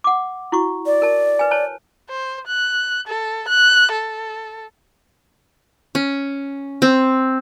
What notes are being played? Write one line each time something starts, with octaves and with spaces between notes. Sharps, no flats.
F#5 D6
E4 F#4 C#6
D5
A#4 A5
B4 G#5
C5 C#5 A5
C5
F#6
A4
F#6
A4
C#4
C4